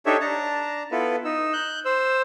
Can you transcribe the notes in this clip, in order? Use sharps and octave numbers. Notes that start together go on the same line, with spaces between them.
D4 D#4 G4 A4 C#5 E5
D4 A5 A#5
B3 E4 F4 A4 B4
D#4 E6
F#6 G6
C5 E6